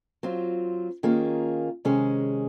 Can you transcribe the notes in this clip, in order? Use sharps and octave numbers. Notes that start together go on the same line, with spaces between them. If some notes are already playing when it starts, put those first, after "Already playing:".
F#3 C4 F4
D#3 A#3 C#4 F4 G#4
C3 D#3 G#3 C#4 G#4